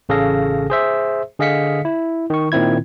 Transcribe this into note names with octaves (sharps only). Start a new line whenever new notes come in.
A1 C#3 G#4 A4 F5 A#6
G#4 C5 E5
D3 G#4 D#5 F5 B6 C#7
E4
D#3 C#6
A#2 D#3 C4 E4 G#6